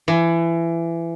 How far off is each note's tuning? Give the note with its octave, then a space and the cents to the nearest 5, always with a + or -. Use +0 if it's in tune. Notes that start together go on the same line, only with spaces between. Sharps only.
E3 +25